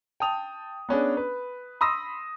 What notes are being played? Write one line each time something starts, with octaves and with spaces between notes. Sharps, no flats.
G5 A5 D#6 F7
B3 C#4 D4 G#4
B4
B5 C6 D#6 E6 A#6